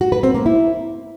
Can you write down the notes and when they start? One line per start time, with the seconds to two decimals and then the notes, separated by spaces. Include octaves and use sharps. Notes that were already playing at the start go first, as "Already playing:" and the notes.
0.01 F#4
0.12 B4
0.23 C4
0.34 A#3
0.46 E4